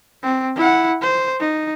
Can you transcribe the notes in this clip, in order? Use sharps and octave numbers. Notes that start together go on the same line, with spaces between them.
C4
E4 F#5
C5
D#4